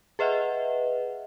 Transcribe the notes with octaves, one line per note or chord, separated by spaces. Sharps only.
G#4 B4 D#5 E5 F#5